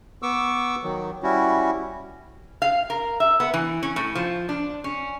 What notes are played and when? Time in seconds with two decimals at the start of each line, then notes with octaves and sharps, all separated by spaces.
0.22 B3 C#6 D6 E6
0.83 D#3 F#3
1.23 G3 C#4 E4 F#4
2.62 F5
2.90 A#4
3.20 E5
3.40 B3
3.54 E3
3.83 C#4
3.96 A2
4.15 F3
4.49 D4
4.84 C#4